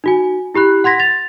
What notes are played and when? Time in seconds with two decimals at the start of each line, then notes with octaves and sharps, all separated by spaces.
0.04 D#4 F#4 G#5
0.54 E4 G4 B5 F#6
0.84 F#5 C6 G#6 A#6 B6
1.00 A6 F7